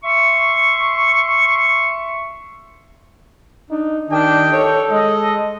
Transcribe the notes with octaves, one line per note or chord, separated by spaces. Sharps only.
E5 C6 C#6
D4 D#4
D#3 D4 G4 D#5 G5
A4 C#5
G#3 D#5